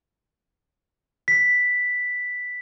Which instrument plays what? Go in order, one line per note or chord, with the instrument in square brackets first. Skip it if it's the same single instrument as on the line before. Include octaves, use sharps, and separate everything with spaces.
[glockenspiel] B6